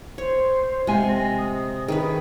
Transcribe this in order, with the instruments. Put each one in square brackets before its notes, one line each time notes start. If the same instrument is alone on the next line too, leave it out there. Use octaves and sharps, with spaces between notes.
[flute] C5 [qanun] C#5
[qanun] C3 [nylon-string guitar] G#3 G#5 [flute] F5
[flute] A#6
D#6
[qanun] D#3 C#4 B4 [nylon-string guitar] G#4